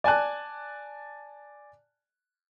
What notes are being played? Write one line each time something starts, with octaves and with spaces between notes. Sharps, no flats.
D5 G#5 A5 F#6